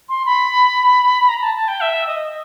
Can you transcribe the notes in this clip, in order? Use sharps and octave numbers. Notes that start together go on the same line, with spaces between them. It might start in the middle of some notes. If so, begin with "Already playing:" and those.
C6
B5
A#5
A5
A5
G5
E5
D#5